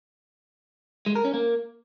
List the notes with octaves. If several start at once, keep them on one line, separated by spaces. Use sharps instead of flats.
G#3
A#4
C#4
A#3